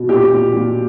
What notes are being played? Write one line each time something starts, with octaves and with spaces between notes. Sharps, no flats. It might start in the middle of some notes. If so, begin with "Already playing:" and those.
Already playing: B2
A#2 G4
A#2
A#2